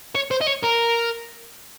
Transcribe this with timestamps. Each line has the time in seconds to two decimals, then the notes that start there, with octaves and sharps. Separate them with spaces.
0.15 C#5
0.31 C5
0.41 D#5
0.47 C#5
0.64 A#4